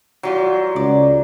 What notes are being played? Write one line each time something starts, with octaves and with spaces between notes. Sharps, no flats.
E3 F#3 G3 F4
C#2 D5